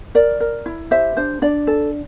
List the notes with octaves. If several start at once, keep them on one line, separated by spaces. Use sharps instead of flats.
A#4 D5
A#4
E4
G4 C5 E5
D4 C5
D4 D5
A4